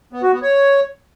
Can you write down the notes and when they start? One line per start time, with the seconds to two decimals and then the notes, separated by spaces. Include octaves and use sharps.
0.13 B3
0.23 F#4
0.32 B3
0.42 C#5